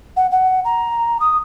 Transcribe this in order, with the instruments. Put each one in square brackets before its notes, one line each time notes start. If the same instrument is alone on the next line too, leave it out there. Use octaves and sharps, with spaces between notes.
[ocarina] F#5
F#5
A#5
D#6